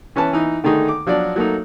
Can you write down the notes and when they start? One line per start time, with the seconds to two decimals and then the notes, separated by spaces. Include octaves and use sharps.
0.16 E3 C#4 B4 A5
0.33 E3 D#4
0.64 D3 D#3 A3 D#4 G#4
0.88 D6
1.06 F3 F#3 D4 D5
1.36 F#3 A3 A#3 D#4